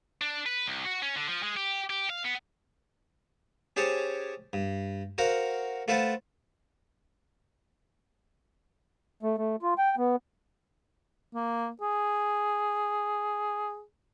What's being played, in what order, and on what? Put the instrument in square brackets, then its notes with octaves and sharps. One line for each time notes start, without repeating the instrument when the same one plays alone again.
[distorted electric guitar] D4
B4
C2
F#4
C#4
D3
F3
G#3
G4
G4
F5
B3
[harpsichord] C#4 G4 G#4 C5 C#5 A5
G2
F#4 A#4 C5 F5 F#5
A3 F4 B4 C5 F#5 A5
[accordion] A3
A3
F4
G5
B3
[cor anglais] A#3
G#4